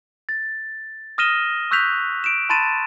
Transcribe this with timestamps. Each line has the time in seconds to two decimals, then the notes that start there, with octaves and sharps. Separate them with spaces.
0.29 A6
1.18 D#6 F6 A#6 D#7 E7 G7
1.71 C#6 E6 F#6 G6 B6 F7
2.24 D7 E7
2.50 A5 B5 C6 A6 D#7 E7